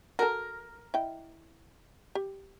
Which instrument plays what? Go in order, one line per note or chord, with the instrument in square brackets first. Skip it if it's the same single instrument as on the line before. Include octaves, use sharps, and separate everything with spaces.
[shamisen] F#4 A4 [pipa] A#4
[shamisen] E4 D#5 G5
G4